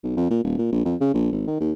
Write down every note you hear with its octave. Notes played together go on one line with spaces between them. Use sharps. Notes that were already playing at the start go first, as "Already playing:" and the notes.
B1
F2
A#2
D#1
A#2
A#1
F2
C#3
A#1
G#1
D#3
D#2